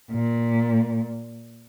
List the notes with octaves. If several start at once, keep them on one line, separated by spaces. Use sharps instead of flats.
A#2